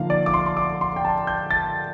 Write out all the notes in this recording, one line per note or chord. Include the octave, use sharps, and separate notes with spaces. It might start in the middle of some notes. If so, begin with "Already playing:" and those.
Already playing: D3 F3 A#3 D#4 F5
D5
D6
C6
C6
D6
C6
G5
A5
G6
A6